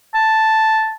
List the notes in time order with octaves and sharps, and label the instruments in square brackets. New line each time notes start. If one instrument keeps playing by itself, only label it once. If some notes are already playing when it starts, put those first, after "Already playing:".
[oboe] A5